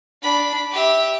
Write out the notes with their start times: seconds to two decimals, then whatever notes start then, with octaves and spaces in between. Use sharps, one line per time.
0.22 D4 B5
0.72 G4 E5